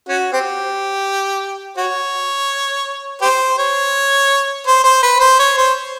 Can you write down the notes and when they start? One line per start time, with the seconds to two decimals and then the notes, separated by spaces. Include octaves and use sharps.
0.09 C#4 F#4
0.33 C4 G4
1.77 F#4 C#5
3.22 G4 C5
3.58 C#5
4.67 C5
4.84 C5
5.03 B4
5.20 C5
5.39 C#5
5.57 C5